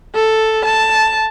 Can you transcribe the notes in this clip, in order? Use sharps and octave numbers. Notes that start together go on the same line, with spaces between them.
A4
A5